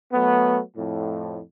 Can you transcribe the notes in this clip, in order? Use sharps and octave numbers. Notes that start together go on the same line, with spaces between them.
F#3 A3 B3
F2 A2